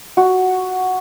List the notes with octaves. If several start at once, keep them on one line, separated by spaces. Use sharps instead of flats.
F#4